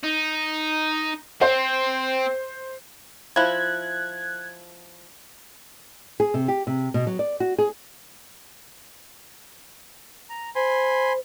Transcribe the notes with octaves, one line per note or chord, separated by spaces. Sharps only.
D#4
C4 C5
F3 E4 F#6 G#6
G#4
C3
G4
C3
B2
F#3
D5
F#4
G#4
A#5
C5 G#5 B5 C6